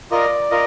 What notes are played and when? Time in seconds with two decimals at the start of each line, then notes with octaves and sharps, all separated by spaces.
0.11 F4 A#4 D5 D#5
0.51 F4 A#4 D#5